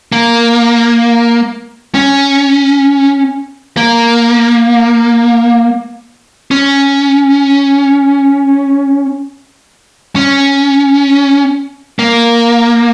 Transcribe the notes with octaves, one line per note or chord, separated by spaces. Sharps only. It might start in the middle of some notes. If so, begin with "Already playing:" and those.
A#3
C#4
A#3
C#4
C#4
A#3